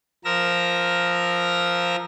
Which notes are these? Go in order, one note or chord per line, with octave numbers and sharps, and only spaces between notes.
F3 A#4 E6 A#6